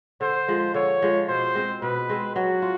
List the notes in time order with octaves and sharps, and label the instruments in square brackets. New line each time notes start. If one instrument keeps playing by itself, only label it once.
[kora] D3 [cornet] C5
[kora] F3 G#3
[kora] D3 [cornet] C#5
[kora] F3 G#3
[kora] B2 [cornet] C5
[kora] G#3 C4
[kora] B2 [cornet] B4
[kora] G#3 C4
[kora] F#3 [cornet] F#4
[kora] F4